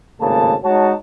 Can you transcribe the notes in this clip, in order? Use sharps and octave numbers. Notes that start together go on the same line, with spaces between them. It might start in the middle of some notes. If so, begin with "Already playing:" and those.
G#1 A2 C#3 A#3 A5
G#3 D#4 F#4 C#5 A5